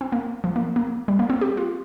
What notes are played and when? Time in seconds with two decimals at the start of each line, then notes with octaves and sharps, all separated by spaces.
0.01 C4
0.12 A#3
0.44 F3
0.56 A#3
0.76 A#3
1.08 G3
1.19 A#3
1.30 C4
1.41 G4
1.57 F4